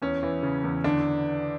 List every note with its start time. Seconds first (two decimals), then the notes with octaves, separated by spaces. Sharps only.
0.02 E2 C#4
0.23 E3
0.43 C#3
0.64 E2
0.84 D3 D4